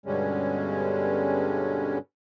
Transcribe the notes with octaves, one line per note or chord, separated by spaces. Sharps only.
G2 B2 D3 G3 G#3 C#4